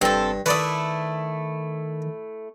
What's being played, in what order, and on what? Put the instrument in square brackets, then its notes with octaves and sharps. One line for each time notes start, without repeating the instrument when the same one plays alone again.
[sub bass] F1 [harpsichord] G2 [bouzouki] C4 A4
[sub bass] D#3 [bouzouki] A3 E4 [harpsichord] B4 D5 D#6